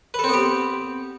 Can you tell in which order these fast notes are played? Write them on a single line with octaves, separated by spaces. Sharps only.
B4 A4 C4 B3 G4